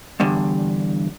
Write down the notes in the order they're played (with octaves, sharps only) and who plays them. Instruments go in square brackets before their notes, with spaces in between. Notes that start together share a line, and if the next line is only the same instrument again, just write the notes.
[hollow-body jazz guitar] E2 G2 D3